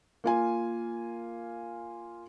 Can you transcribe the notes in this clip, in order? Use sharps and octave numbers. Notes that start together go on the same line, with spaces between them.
A#3 F4 G#5